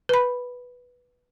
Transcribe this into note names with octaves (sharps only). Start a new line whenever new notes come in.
B4 B5